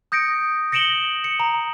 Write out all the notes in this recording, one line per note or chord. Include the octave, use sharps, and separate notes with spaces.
D#6 G6 A#6 C#7 D7
A#6 C#7 D7 E7 F#7 G7
C#7
A#5